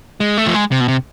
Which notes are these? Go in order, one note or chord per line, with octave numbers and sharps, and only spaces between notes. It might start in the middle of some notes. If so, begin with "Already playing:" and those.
G#3
A3
F3
G#3
C3
B2
C3